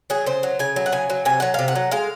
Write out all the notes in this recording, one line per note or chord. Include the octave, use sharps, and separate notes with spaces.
F#3 G#4
C#3 C5
F#3
C#3 G#5
F#3
F#5
C#3 G#5
F#3
C3 G#5
F#3 F#5
C3 F5
F#5
F#3
G#3 F5